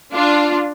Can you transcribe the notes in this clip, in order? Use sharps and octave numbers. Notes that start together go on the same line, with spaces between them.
D4 F4